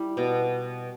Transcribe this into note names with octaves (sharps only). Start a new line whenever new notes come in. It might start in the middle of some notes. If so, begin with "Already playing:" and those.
Already playing: G3 E4
B2